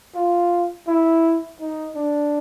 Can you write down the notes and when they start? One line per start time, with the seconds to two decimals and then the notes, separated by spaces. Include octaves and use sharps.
0.16 F4
0.88 E4
1.60 D#4
1.96 D4